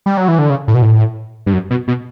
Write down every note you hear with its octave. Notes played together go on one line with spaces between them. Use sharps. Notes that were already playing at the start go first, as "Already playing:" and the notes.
G3
F#3
E3
D3
C#3
A2
B2
A2
G2
F#2
B2
B2